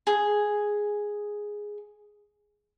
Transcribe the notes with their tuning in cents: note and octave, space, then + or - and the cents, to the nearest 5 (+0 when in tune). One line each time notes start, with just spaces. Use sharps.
G#4 +0